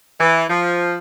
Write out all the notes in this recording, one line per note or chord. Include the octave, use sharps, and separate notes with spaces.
E3
F3